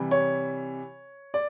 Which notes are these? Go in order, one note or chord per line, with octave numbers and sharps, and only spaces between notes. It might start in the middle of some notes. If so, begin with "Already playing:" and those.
Already playing: C3 E3 G3
C#5
D5